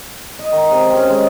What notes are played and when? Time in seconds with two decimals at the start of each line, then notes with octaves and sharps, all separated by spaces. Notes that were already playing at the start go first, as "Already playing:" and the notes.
0.39 D#5
0.52 D#3
0.71 C3
0.97 C#4
1.10 G#3